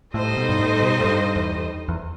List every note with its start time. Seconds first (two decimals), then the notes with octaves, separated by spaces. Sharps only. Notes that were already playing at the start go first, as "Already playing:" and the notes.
0.14 A2 G3 D#4 A4 C5 D#5
0.37 B2
0.49 G2
0.59 A2
0.82 B2
1.01 A2
1.04 G2
1.36 E2
1.88 E2